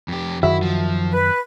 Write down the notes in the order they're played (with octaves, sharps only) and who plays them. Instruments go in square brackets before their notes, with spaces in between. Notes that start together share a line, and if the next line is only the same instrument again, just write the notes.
[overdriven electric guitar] F2 G4
[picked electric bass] F#2 D#3 [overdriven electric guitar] E4 [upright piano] F#4 E5
[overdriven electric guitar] F3
[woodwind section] B4